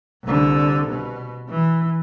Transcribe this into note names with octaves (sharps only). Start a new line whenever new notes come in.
C2 D3
B2
E3